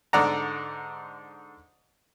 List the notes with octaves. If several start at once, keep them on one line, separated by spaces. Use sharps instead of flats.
G#2 D3 D5 F#5 A#5